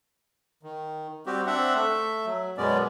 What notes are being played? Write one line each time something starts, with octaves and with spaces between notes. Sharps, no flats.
D#3
G3 C4 F#4 G4
C4 D4 E5 F#5
A3 E5
F#3
F#2 B2 G#3 B3 C#4 D5